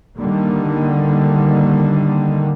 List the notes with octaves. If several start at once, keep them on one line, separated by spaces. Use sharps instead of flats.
D3 D#3 G3 A#3